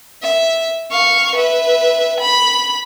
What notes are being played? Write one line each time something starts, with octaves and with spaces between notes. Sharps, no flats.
E5
F5 C#6
B4 E5
B5